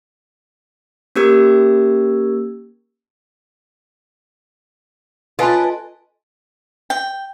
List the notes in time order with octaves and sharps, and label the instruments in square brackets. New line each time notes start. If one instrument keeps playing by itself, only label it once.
[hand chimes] A#3 C#4 G4 A#4 E6 G#6
[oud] C#4 F4 [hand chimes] A4 G#5 A5 [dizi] B4 [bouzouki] D#5
[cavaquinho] G5